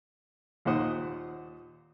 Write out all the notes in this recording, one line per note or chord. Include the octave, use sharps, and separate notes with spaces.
D#2 A#2 D#3 C5 F#5 D#6